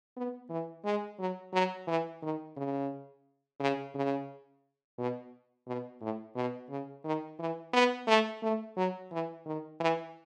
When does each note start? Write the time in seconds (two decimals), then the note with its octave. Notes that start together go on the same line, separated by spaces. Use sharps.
0.16 B3
0.50 E3
0.85 G#3
1.19 F#3
1.53 F#3
1.88 E3
2.23 D#3
2.57 C#3
3.60 C#3
3.95 C#3
4.99 B2
5.67 B2
6.01 A2
6.36 B2
6.70 C#3
7.04 D#3
7.39 E3
7.73 B3
8.08 A3
8.43 A3
8.77 F#3
9.12 E3
9.46 D#3
9.80 E3